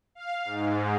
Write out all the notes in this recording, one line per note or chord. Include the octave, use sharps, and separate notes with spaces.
F5
G#2